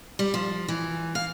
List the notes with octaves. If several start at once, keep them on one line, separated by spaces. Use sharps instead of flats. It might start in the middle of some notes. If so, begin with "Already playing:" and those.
G3
F3
E3
F5